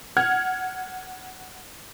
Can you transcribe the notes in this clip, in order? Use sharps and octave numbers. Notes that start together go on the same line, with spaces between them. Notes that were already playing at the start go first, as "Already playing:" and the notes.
F#5 F6 G#6